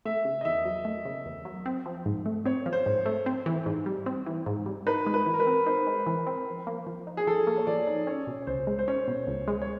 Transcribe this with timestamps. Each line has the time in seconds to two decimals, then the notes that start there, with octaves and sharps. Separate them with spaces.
0.05 A3 E5
0.25 C#3
0.41 D#5
0.45 E2 E5
0.65 F#3
0.85 A3 D#5
1.05 C#3
1.26 E2
1.45 F#3
1.66 C4
1.86 F3
2.06 G#2
2.26 A3
2.46 C4 C#5
2.66 F3
2.73 C5
2.86 G#2
3.06 A3
3.26 C4
3.46 E3
3.66 G#2
3.86 G3
4.06 C4
4.27 E3
4.46 G#2
4.66 G3
4.87 D#4 B4
5.07 G#3
5.14 B4
5.26 E3
5.34 A#4
5.40 B4
5.47 C4
5.66 D#4 C5
5.87 G#3
6.07 E3
6.27 C4
6.48 F3
6.67 A#3
6.87 F3
7.07 D#4
7.17 G#4
7.27 F3 A4
7.47 A#3
7.58 C#5
7.67 F3 D5
7.87 D#4
8.07 C#4 C#5
8.27 B2
8.42 C#5
8.47 C#2 C5
8.67 G#3
8.79 C5
8.88 C#4 C#5
9.08 B2
9.27 C#2
9.48 G#3
9.62 C#5